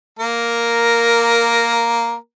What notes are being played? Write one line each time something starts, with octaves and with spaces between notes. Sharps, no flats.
A#3 A#4